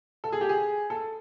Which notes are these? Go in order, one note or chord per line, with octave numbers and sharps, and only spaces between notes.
A4
G#4
G4
G#4
A4